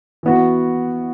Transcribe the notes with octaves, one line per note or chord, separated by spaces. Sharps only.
E3 B3 F#4